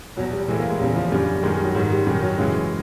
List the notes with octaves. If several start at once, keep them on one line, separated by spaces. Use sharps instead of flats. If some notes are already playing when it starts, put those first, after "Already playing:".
E2 B2 F#3
G3
A2 E3 G#3
A#3
G#3
E2 C#3 E3 G3
F3
F#2 D3 G3
F#2 D#3 G#3
G3
F#3
G#2 D#3 F#3
G3
F#2 D#3 G3
F#3
F#2 C#3 E3 G#3